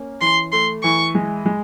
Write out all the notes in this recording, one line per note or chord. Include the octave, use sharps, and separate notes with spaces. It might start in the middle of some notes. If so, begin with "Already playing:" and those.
Already playing: A#3 C#4
E3 C6
A3 C6
E3 C#6
G#3
G#3